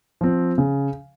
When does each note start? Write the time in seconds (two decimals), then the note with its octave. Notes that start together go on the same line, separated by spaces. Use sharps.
0.21 F3 C4
0.58 C#3